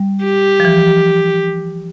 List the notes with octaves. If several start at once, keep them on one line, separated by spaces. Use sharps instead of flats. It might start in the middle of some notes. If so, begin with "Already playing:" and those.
Already playing: G3
G4
F3
E3